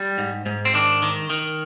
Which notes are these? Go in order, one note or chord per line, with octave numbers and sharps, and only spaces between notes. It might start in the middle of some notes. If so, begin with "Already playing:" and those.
Already playing: G3
G#2
G#2
C4
D#3 D4
D#3
D#3